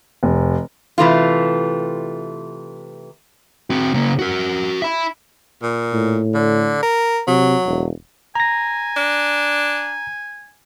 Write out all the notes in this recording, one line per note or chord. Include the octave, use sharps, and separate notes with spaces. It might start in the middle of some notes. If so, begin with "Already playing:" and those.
F1
C3 E3 A3 F4
C4 F#4
C#3 A#3
F#4 A#4
E5 B5
A#2
A2
D3
A#4
C3 F#3
E1
G#5 A#5 A#6
D4